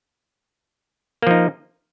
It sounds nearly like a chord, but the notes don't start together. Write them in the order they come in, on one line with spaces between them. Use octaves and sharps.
A#3 F3 D#4